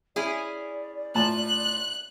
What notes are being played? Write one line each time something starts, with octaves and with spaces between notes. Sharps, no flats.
C#4 E4 G#4 D5
A2 F4 A5 F#6